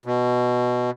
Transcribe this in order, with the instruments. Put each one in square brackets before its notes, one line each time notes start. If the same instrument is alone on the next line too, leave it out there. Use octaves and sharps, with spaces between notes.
[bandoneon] B2